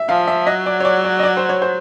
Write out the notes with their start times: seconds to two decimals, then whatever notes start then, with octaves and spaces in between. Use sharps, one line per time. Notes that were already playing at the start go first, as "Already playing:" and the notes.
Already playing: E5
0.09 F3 F5
0.28 E5
0.47 F#3 D#5
0.66 D5
0.80 C#5
0.85 D5
1.04 D5
1.19 D#5
1.23 D5
1.37 C5
1.49 C#5
1.62 C5